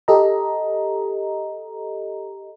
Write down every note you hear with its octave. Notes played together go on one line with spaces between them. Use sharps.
G4 A4 D#5 A#5